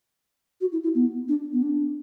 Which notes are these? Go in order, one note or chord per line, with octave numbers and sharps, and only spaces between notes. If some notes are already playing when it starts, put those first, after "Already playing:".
F#4
E4
E4
B3
D4
B3
D4